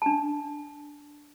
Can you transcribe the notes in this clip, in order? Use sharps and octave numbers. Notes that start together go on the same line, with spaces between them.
D4 A5